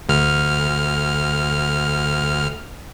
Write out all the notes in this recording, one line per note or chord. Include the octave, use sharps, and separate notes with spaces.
D2 F6